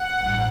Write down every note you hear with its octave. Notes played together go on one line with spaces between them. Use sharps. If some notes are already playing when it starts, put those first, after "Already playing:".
Already playing: F#5
A1 G2